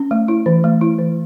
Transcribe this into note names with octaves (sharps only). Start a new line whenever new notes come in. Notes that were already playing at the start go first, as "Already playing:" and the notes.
Already playing: C#4
A3
E4
E3
A3
E4
E3